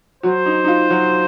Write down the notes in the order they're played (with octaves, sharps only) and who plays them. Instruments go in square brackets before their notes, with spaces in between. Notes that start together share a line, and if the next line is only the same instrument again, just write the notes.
[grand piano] F#3 F#4 [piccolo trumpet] C5
[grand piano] D#4
D#4
F4
F#3 F#4